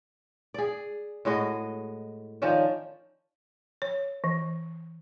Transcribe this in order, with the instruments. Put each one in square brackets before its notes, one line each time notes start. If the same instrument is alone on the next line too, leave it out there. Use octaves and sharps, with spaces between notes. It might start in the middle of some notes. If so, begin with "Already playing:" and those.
[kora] G#4 D5
A2 G#3 F#4 D#5
D#3 F3 C#4 D4
[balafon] C#5
E3